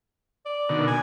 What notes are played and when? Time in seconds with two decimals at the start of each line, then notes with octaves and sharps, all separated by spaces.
0.45 D5
0.69 B2 D3 D#3
0.87 G#5